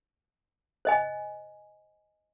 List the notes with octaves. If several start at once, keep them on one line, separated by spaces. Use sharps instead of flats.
C5 D#5 G#5